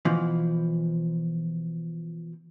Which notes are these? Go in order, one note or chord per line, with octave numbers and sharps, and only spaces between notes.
B2 E3 F3